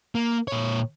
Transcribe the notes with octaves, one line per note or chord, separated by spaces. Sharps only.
A#3
A#2 C#5